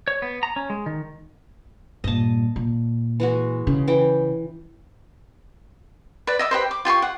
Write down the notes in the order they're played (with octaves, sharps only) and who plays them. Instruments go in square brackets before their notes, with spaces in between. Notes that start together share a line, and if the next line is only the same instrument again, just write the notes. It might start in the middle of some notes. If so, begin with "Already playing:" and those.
[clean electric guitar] C#5
B3
A#5
C#4
G#3
D#3
[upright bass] G2 A#2 [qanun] D#5 A5
[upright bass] A#2
[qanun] E3 G#3 F#4
[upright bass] C#3
[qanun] E3 G5
[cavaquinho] B4 D5
D#5 E5 D6
G4 B4 C5
D6
F4 G4 C6 C#6
F#5